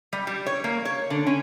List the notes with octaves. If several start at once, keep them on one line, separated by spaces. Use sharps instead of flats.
G3
G3
C#5
A#3
C#5
D3
C#4